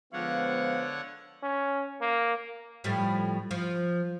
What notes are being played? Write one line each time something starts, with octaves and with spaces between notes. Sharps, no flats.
D3 F3 G#3 B3 C#5 F5 F#5
C#4
A#3
A2 F3 G3
F3